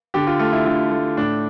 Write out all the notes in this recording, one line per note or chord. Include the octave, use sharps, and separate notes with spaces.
D3 G4
F4
A3 F4
E4
D3 F4
A3
A2 D4